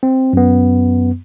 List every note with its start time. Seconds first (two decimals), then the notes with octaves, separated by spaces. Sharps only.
0.03 C4
0.33 F#2 B3